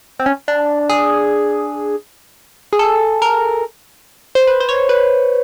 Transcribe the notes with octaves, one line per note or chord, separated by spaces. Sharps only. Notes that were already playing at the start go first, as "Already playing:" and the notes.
C4
C#4
D4
G#4
G#4
A4
A#4
C5
B4
C5
C#5
B4